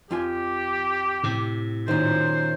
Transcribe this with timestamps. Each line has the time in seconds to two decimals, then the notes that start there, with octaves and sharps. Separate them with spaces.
0.11 F2 F4 G4 G#5
1.23 A2 C3
1.88 F#2 A#2 D#3 C5